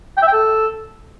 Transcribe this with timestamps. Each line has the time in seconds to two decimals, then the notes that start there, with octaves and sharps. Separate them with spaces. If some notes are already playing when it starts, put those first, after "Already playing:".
0.17 G5
0.22 E5
0.27 G5
0.33 A4